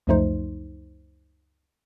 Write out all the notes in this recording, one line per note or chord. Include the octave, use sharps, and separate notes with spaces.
C#2 F#2 F3 A3 D#4 C5